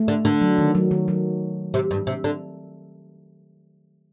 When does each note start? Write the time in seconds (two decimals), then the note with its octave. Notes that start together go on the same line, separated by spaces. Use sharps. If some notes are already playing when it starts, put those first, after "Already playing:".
Already playing: A3
0.08 D3
0.25 D3
0.41 F#3
0.58 D#3
0.75 F#3
0.91 D#3
1.08 F#3
1.74 C3
1.91 G2
2.07 C3
2.24 D3